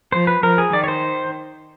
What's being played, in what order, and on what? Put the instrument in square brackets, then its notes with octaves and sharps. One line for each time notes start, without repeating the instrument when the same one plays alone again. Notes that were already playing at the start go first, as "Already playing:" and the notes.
[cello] F3 [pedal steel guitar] C5
[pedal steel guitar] B4
[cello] F3 [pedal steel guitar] A#4
[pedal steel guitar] G#4
[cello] D#3 [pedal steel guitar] D5
[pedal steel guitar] C#5
C5